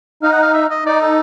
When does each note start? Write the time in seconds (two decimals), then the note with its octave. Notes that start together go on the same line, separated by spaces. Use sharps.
0.23 D#4 F5
0.32 F#5
0.43 F5
0.54 E5
0.70 D#5
0.85 D#4 D5
1.01 A4